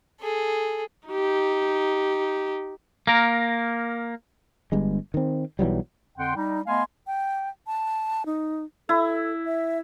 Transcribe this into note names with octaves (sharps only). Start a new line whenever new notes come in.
G#4 A4
D#4 G4
A#3 A#4
G1 G2 G#3
D#3 C4
B1 E3 F#3 G3
F2 D3 F#5 G5 C6
G3 D#4
A3 B3 D#5 F5 G#5 C6
G5
A5
D#4
E4 A4
E5